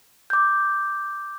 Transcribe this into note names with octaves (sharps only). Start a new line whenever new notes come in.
D6 G6